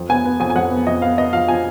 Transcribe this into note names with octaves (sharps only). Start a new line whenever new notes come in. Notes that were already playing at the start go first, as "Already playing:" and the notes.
Already playing: F2
B3 G#5
B3
F2 G#5
G#5
F2 F#5
B3
F2 D#5
B3 F5
B3 D#5
F3 F5
F3 G#5